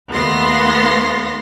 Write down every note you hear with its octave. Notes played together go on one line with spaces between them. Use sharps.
D#2 A3 B3 F5 C6 A#6